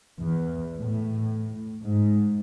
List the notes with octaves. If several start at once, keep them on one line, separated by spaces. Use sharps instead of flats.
E2
A2
G#2